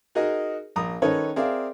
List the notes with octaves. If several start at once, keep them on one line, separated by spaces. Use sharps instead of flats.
D#4 F#4 G#4 A#4 D#5
A#1 A#5 D#6
D#3 C#4 D#4 A4 B4 C#5
C4 G#4 A#4 D5 E5 F5